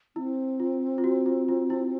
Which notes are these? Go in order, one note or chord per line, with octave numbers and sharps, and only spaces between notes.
C4 E4
F4
F4
F#4
F4
F4
E4